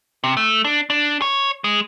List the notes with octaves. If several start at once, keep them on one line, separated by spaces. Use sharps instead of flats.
C3
A3
D4
D4
C#5
G#3